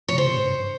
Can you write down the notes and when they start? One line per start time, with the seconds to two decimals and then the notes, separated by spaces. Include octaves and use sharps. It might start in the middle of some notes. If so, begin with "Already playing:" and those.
0.08 C#5
0.12 C3
0.18 C#3 C5
0.27 C3
0.37 G#2
0.45 G2